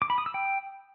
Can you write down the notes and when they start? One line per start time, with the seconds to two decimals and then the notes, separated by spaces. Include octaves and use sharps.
0.02 D6
0.10 B5
0.18 D#6
0.26 E6
0.34 G5